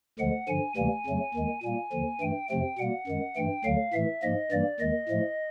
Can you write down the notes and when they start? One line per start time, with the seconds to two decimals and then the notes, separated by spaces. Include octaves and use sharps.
0.19 D2 D3 F3 G#3 F#5
0.48 G2 D3 F3 G#5
0.77 D2 C3 E3 G3 A#3 G#5
1.06 F2 C#3 F#3 A3
1.34 D#2 D#3 G#3
1.63 A#2 G3 A#3 G#5
1.92 D#2 D3 F3
2.21 G2 E3 A3 G5
2.50 F2 C3 F3 A3 G5
2.78 B2 G3 A#3 F#5
3.08 F#2 D#3 G#3
3.36 G2 E3 A3 G5
3.65 D2 D3 F#3 F5
3.93 A2 E3 A3 E5
4.22 G#2 F3 A#3 D#5
4.51 G2 E3 G3 A#3 D5
4.80 D#2 D#3 G#3 D#5
5.09 A2 F3 A3